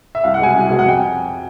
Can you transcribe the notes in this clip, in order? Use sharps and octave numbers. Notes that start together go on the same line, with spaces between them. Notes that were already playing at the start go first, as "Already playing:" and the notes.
E5
C2 F5
F#5
B2 G#3 G#5
C2
B2 G#3
F#5
F2 G5